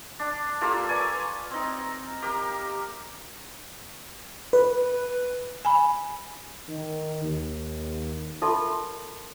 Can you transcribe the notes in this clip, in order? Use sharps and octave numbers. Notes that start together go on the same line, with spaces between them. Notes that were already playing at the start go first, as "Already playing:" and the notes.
D4
A#3 F4 G4 A4
B4 C#5 D5 G#5
C4 D#4
G4 A#4
B4
G#5 B5
D#3
D#2
F4 A4 A#4 E5 A5 C6